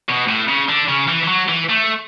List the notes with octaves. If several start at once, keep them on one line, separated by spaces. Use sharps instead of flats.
B2
A2
C#3
D3
C#3
E3
E3
F#3
E3
A3